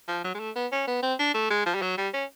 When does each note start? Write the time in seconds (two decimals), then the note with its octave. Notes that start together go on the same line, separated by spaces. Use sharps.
0.08 F3
0.24 F#3
0.34 G#3
0.39 A3
0.55 B3
0.72 C#4
0.87 B3
1.03 C4
1.19 D4
1.34 A3
1.50 G#3
1.66 F3
1.74 G3
1.82 F#3
1.97 G3
2.13 C#4